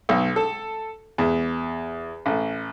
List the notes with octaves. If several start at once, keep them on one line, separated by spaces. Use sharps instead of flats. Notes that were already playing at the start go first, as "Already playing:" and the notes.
B1
A4
E2
A1